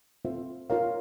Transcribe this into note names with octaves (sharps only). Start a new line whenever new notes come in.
C4 F4 A4 C5 E5
F4 A#4 C#5 F5